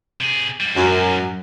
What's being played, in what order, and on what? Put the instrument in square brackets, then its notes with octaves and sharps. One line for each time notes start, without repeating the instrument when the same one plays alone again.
[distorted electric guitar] C3 G#4
G#2 G3
[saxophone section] F#2